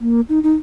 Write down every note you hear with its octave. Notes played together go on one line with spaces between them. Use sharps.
A#3
D#4
D#4